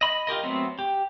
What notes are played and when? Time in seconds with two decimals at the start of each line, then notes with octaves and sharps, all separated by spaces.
0.01 D#5 B5
0.27 F4 G4 A#4 D#5
0.43 F#3 A3 B3 C4
0.79 G4